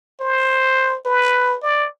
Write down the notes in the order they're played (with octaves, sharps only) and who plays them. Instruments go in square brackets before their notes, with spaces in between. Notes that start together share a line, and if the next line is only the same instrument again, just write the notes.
[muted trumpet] C5
B4
D5